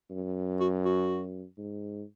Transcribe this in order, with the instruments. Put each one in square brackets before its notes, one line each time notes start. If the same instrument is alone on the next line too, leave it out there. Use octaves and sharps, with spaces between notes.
[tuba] F#2
[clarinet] F#4
F#4
[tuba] G#2